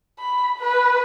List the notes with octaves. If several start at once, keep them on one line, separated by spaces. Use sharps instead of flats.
B5
B4